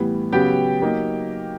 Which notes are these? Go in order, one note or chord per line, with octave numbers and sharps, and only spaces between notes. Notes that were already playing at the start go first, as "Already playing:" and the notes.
Already playing: A2 E3 G3 B3
C#3 F#3 B3 G4 G5
F#3 A#3 D#4